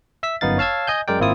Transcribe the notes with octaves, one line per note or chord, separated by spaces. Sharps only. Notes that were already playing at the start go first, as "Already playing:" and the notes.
E5 E6 B6
G1 F#2 B3 D#4 F5 A6
C#5 F5 A5 E6 G#6
D#5 G#5 G6
F#2 G#3 A#4 D5 G5
G#1 A#3 C4 E4 F4 D#6